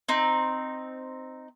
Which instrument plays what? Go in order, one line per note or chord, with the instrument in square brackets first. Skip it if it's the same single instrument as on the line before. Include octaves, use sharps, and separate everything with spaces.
[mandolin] C4 D#4